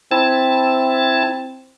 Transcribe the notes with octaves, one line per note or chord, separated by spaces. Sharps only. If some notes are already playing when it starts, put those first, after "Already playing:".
C4 E4 A5